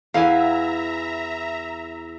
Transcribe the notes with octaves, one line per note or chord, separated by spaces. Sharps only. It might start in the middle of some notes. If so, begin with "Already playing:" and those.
E2 E4 E5 F5 G#5 A#5